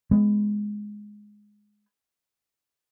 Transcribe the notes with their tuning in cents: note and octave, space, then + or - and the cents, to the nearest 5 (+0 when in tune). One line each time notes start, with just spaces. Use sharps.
G#3 +0 B3 +20